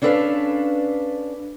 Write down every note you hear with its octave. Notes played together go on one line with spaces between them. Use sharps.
C#4 D4 E4 A4 B4 F5